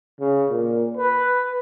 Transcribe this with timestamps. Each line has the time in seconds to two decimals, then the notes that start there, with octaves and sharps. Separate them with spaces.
0.20 C#3
0.50 A#2
0.97 B4